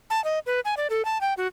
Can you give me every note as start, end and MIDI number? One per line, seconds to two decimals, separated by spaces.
0.10 0.23 81
0.24 0.39 75
0.46 0.60 71
0.65 0.75 80
0.77 0.87 74
0.90 1.05 69
1.05 1.20 81
1.21 1.34 79
1.37 1.47 66